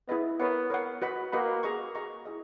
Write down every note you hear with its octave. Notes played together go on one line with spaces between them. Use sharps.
B3 E4 G#4 B4 D#5
B3 A#4 C#5 F#5
A#4 C#5 F#5
F#4 B4 D#5 F#5 B5
A#3 F#4 B4 D#5 F#5 B5
G#4 D#5 A#5 C#6
G#4 D#5 A#5 C#6
E4 G#4 D#5